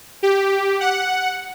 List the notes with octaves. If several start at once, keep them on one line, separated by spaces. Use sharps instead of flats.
G4
F#5